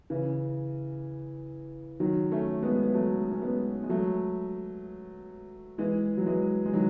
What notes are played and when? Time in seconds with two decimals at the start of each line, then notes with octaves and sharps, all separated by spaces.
0.10 C#3 E3
2.00 D#3 F#3
2.31 A3 C#4
2.63 G#3 B3
2.84 B3
2.94 F#3 A3
3.31 C#4
3.41 G#3 B3
3.83 G#3
3.89 F#3 A3
5.78 E3 G#3
6.17 F#3
6.26 E3 G#3
6.65 G#3
6.73 D#3 F#3